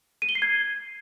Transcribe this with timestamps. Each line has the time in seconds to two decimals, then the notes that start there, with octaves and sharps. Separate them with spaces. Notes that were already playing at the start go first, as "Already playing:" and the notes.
0.22 D#7
0.29 G7
0.35 C7
0.42 G#6